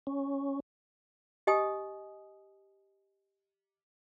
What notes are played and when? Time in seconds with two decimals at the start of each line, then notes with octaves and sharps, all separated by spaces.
0.07 C#4
1.47 G4 D#5 G#5 D#6